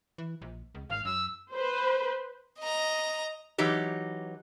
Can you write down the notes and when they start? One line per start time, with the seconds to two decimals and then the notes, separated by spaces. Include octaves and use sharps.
0.18 E3
0.42 A#1
0.75 C#2
0.90 G#1 F5
1.05 F#2 E6
1.52 B4 C5
2.60 D#5 A#5
3.58 E3 F#3 D#4 G4